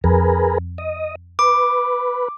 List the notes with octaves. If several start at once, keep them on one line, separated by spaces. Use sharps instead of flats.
F2 G#4 A#4 B4
D#5
B4 D6